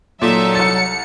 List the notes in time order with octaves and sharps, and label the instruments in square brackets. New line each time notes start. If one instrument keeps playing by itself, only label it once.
[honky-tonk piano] A#2 [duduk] F#3 [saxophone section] D#4 A4 [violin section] E5
[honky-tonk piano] C2 A6 [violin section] C#7